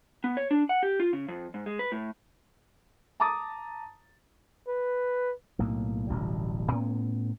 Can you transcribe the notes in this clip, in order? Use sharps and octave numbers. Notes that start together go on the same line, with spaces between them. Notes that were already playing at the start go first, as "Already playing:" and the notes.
B3
C#5
D4
F#5
G4
F4
C#3
F2
G#2
G#3
B4
A2
A5 A#5 D6 D#6 A6
B4
B1 A2 A#3
D1 A1 B2 G3
A2 B3 C#4